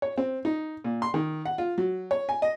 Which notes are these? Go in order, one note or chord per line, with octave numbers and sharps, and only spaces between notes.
C#5
C4
D#4
A#2
C6
D#3
F#5
F4
F#3
C#5
G#5
D#5